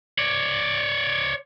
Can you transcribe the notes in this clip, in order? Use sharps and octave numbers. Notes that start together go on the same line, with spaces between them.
C#5 D5